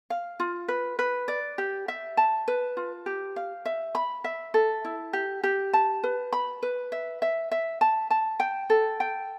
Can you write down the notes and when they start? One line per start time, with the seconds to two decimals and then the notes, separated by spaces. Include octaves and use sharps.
0.10 F5
0.40 F4
0.68 B4
0.99 B4
1.28 D5
1.58 G4
1.88 E5
2.17 A5
2.48 B4
2.77 F4
3.06 G4
3.36 F5
3.65 E5
3.95 B5
4.24 E5
4.54 A4
4.85 E4
5.13 G4
5.43 G4
5.73 A5
6.04 B4
6.33 B5
6.63 B4
6.92 E5
7.22 E5
7.51 E5
7.81 A5
8.10 A5
8.40 G5
8.70 A4
9.00 G5